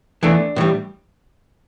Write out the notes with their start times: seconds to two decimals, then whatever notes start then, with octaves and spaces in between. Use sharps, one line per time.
0.23 E2 E3 A3 D4
0.56 A2 E3 G3